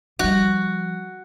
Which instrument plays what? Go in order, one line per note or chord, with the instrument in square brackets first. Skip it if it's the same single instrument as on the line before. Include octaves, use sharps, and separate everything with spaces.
[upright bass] F3 G3 [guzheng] F#4